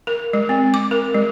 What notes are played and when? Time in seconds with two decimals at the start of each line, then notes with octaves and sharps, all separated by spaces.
0.07 A#4
0.33 G#3
0.49 C4
0.74 D6
0.91 A#4
1.14 G#3